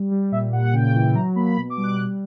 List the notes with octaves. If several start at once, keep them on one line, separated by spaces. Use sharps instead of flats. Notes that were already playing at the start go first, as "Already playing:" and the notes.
Already playing: G3
G3
A#2 E5
A#2 F#5
F#5
C#3 G5
E3
F#3 A#5
A#3 B5
B2 B5
D6
G3
F#6
G3 F#6